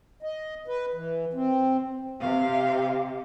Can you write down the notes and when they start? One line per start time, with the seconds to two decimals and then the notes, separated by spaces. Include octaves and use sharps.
0.23 D#5
0.68 B4
0.93 E3
1.33 C4
2.21 C3 F5